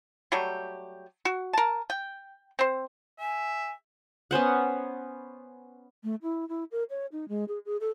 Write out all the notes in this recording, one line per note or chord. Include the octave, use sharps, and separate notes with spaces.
F#3 G3 A3 G4
F#4
A#4 A5
G5
C4 C5
E5 G#5
B3 C#4 C5 F#5
A3
E4
E4
A#4
C#5
D#4
G#3
G#4
G#4
A4